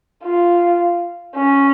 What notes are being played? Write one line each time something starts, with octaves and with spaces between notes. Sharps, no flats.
F4
C#4